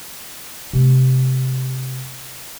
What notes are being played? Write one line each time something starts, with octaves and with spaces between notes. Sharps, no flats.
C3 A3